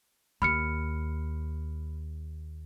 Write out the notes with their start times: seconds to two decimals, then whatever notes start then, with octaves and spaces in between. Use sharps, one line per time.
0.42 D#2 B5 F6 C#7